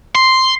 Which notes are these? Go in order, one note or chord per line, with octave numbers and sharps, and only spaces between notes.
C6